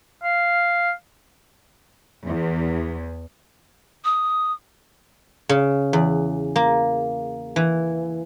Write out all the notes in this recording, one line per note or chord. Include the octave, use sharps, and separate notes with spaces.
F5
E2
D#6
C#3
E2
A#3
E3